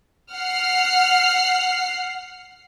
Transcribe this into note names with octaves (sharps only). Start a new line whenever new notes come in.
F#5 F6 C7